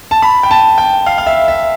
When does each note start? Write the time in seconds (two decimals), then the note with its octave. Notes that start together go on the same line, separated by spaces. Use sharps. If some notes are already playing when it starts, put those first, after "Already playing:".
0.11 A5
0.22 B5
0.43 G5
0.51 A5
0.78 G5
1.06 F5
1.18 F5
1.26 E5
1.48 E5